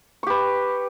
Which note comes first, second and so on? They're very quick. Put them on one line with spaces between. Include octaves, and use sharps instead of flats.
C#6 G4 B4